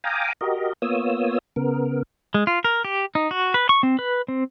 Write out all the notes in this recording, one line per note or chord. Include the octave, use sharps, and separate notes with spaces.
F5 G5 G#5 A#5 D6 D#6
F#4 G4 A#4 D#5
A#3 B3 F4 C#5 D#6 E6
C#3 B3 A#4
G#3
F4
A#4
G4
D#4
F#4
B4
C#6
C4
B4
C4